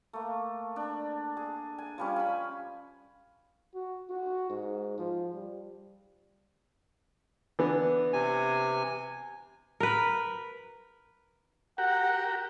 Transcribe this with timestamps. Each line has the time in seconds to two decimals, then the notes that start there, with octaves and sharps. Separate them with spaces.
0.13 A3 A#3
0.76 D4
1.37 G#4
1.78 G#5
1.98 F3 G3 C#4
2.16 G#5 B5
3.75 F#4
4.10 F#4
4.49 G#2
4.98 F3
5.34 G3
7.59 E3 B3 D4
8.13 C3 G#5
9.80 A#4 B4
11.78 F#4 G4 A#4 F#5